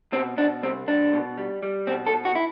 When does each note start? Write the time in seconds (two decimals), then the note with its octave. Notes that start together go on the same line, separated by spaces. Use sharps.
0.12 B2 C4
0.37 B2 D4
0.63 C2 C4
0.87 C2 D4
1.13 B2
1.38 G3
1.63 G3
1.87 B2 C4
2.07 A4
2.13 B2
2.25 F#4
2.35 E4